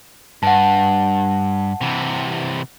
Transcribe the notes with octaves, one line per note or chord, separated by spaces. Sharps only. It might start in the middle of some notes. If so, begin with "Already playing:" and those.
G2 F#5 A5
C3 E3